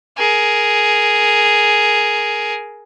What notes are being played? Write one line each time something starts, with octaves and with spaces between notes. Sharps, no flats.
G#4 A#4